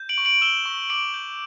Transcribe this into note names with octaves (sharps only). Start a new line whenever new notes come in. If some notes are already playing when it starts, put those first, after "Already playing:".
Already playing: G6
D7 F#7
C#6
D7 F#7
E6 E7 G7
C#6
D6 D7 F#7
G6